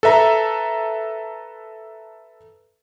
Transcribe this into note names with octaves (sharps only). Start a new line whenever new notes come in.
A4 B4 E5 A#5